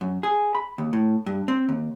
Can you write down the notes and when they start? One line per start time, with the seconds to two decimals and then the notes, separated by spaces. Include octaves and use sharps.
0.01 F#2
0.23 G#4
0.55 B5
0.78 D#2
0.93 A2
1.26 G2
1.48 C4
1.69 D#2